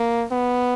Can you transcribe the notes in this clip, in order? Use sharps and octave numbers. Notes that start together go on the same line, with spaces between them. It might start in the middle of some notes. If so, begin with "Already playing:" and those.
Already playing: A#3
B3